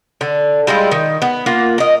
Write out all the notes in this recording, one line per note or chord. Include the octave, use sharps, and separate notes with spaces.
D3
G3 G#3 E4 F4
D#3
B3
A#3 F4 F#5
A#4 D#5